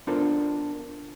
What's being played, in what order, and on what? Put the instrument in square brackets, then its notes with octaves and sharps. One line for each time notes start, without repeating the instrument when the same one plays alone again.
[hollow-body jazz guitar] B3 D4 F4 A4 A#4 C5